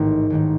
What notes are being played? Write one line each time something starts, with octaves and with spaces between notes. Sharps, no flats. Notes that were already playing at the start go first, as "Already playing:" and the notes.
Already playing: A1 G#2 D#3
A1 G#2 D#3